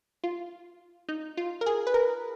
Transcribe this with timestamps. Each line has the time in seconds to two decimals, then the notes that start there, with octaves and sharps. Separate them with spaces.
0.24 F4
1.08 D#4
1.37 F4
1.61 A#4
1.66 G#4
1.87 B4
1.94 A#4